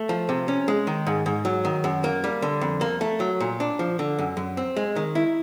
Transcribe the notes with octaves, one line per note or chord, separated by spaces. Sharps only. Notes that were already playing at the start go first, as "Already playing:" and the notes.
Already playing: A3
F3
C3
C#4
G#3
D#3
G#2
G#2
F#3
D#3
F#2
A#3
G3
D3
F2
A#3
A3
F#3
A#2
D4
F3
D3
F#2
F#2
C4
G#3
D#3
E4